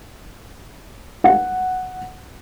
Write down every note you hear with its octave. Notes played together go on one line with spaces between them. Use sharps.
F#5